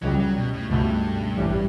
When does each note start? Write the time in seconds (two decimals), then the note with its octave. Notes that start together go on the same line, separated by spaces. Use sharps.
0.02 C#2 C#3 F#3 G3
0.20 F#3
0.36 B2
0.54 A2
0.70 C#2 G2 B2 A3
1.37 A1 A2 E3 G3